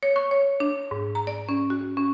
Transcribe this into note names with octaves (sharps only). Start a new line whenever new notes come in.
C#5
C#6
C#5
D4
G#2
A#5
D5
C#4
F#4
C#4